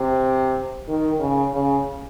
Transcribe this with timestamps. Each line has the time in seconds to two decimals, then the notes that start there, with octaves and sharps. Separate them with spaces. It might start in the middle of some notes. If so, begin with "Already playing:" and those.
Already playing: C3
0.88 D#3
1.20 C#3
1.54 C#3